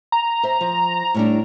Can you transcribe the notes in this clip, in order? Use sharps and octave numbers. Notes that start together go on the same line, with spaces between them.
A#5
C5 E5
F3
A2 G3 D4